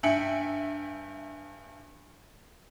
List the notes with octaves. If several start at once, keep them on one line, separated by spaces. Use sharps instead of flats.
G2 E5 G5 G#5 C#7 F#7